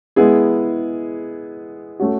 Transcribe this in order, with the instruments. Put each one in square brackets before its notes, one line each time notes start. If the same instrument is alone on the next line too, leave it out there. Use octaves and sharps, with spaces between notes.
[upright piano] G#3 B3 E4 G#4
A3 C#4 F#4